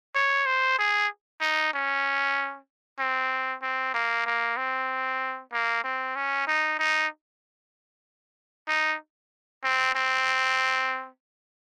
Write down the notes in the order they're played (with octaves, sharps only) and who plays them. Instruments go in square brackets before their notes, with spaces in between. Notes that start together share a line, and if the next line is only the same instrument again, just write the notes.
[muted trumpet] C#5
C5
G#4
D#4
C#4
C4
C4
A#3
A#3
C4
A#3
C4
C#4
D#4
D#4
D#4
C4
C4